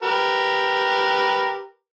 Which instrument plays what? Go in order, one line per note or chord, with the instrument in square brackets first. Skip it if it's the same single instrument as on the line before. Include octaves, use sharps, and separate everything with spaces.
[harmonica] G4 A#4 B4